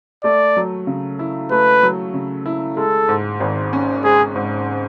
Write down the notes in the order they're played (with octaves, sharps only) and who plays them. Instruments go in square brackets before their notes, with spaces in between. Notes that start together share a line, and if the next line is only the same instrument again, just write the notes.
[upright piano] A3 [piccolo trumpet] D5
[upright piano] F#3
C#3
E4
[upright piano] A3 [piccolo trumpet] B4
[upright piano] F#3
C#3
E4
[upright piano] G#3 [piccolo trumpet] A4
[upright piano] G#2
G#1
C#4
[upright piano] G#3 [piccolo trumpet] G#4
[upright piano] G#2